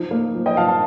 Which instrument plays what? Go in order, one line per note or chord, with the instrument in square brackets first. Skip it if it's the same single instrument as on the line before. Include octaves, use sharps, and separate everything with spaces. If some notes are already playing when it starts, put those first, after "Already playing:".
Already playing: [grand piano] F3 D#4
A#3
F3
[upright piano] D#5 G5
[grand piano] F3 [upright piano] F5 A5
[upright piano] F5 A5